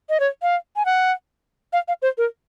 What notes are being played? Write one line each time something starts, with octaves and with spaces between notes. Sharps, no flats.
D#5
C#5
F5
G#5
F#5
F5
F5
C5
A#4